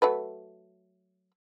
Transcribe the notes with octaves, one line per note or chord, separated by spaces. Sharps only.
F#3 A3 B4